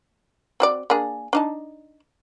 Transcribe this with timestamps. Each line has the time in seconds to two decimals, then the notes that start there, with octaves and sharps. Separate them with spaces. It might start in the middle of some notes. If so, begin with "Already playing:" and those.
0.60 C4 F#4 D5
0.90 A#3 D4 G#4
1.33 D4 D#4 A5